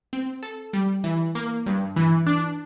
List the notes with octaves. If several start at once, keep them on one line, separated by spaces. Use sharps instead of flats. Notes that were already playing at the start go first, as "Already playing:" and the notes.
C4
A4
G3
E3
A#3
G2
E3
D4